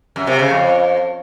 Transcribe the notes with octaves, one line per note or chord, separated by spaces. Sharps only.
F#2
C3
C#3
F2